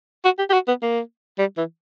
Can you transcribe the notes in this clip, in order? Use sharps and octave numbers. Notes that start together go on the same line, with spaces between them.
F#4
G4
G4
F#4
B3
A#3
G3
E3